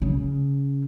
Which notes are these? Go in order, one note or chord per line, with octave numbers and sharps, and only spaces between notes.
C#3